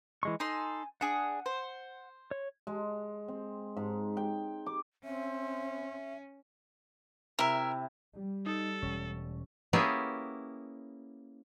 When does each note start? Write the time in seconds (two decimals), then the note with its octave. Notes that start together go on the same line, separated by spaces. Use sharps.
0.23 E3 G#3 C#6
0.40 D#4 A4 G#5 C6
1.01 D4 G#4 F#5
1.46 C5
2.31 C#5
2.67 G#3
3.28 C4
3.77 G#2
4.17 G5
4.66 D6
5.04 C4 C#4 E5
7.39 C3 E4 A#4 E5
8.16 G3
8.46 D#4 A4
8.82 E1 C#4
9.73 A#3 B3 C#4 E4 G4 G#4